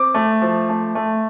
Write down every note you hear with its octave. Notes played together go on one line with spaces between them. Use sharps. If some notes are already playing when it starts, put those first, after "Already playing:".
Already playing: C4 D6
A3
F3
A3
A3